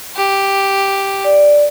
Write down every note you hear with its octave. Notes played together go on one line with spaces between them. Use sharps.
G4
D5